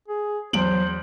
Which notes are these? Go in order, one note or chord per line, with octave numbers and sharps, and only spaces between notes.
G#4
E2 F#3 C5 D7 F#7